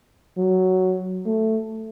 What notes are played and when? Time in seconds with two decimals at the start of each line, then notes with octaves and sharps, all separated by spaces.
0.37 F#3
1.26 A3